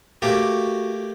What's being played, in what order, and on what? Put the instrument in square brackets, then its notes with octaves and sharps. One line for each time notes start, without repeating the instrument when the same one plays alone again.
[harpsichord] A3 A#3 G4 [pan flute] F#4